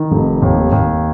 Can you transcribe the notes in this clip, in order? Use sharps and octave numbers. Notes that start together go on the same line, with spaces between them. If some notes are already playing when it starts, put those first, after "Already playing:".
Already playing: D#3
F1
D#2
D#2